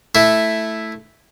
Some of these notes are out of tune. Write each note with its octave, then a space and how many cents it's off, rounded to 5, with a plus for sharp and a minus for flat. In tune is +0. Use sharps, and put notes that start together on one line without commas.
A3 +0 E4 +0